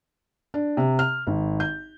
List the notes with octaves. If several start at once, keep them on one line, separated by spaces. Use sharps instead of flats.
D4
C3
F6
G#1
G6